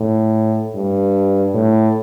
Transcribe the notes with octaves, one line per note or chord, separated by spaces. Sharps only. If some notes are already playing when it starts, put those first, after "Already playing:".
Already playing: A2
G2
A2